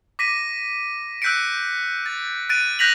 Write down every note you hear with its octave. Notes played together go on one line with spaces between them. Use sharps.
D6 A#6 B6 D#7
E6 F#6 G6 B6 C#7 D7
A6
F#6 A6 D7 D#7
F#6 G6 A#6 B6 F7 F#7